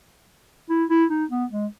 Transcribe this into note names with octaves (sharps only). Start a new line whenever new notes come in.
E4
E4
D#4
B3
G#3